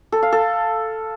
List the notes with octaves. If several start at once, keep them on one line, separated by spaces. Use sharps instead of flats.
A4
F5
A4